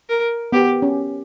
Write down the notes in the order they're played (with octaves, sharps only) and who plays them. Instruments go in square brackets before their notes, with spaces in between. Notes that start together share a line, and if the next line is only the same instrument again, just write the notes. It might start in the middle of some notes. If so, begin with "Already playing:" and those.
[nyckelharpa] A#4
[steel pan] B3 [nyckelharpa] G4
[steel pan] C#4